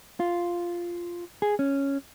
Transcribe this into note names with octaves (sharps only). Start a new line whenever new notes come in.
F4
G#4
C#4